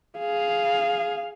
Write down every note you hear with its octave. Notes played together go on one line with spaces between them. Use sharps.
G#4 F5